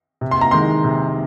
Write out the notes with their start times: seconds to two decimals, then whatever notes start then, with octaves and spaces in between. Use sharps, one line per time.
0.21 C3
0.31 C6
0.41 A#5
0.51 D#3 G#3 C6
0.84 C3